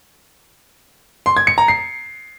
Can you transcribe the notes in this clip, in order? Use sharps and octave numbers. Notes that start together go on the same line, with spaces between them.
C6
G#6
C#7
A#5
C7